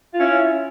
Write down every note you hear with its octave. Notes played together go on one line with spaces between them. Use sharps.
C#4 E4 F4